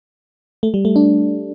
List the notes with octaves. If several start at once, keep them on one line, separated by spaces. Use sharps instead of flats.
A3
G3
A3
D4